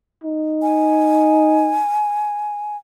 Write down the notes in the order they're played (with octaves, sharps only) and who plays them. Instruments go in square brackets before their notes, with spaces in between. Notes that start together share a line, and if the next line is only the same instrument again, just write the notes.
[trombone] D#4
[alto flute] G#5